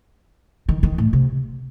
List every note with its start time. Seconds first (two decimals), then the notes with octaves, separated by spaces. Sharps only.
0.69 D#3
0.83 D#3
0.98 A2
1.13 C3